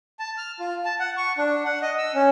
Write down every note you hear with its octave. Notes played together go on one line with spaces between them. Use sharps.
A5
F6
F4
A5
F#5
C#6
D4
F#5
D#5
E6
C#4